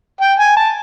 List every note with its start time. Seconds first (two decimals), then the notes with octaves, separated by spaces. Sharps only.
0.21 G5
0.39 G#5
0.57 A5